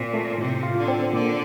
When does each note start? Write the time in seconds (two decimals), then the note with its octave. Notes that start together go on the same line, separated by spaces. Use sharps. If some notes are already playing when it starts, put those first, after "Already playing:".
Already playing: A#2 C4 F4
0.14 A3
0.38 A2 C3
0.63 F4
0.75 D3
0.88 C4
1.13 A#2 D3